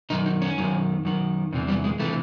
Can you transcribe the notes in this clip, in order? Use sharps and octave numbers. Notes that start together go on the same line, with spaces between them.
F#2 D#3 D#4
D#4
C#4
F#2 D#3
F#2 D#3
E2 C3 E3
G3
G#3
C3 E3 A3